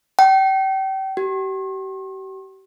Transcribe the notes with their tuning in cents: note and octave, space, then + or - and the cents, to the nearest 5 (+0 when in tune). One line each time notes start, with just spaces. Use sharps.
G5 -35
G4 -40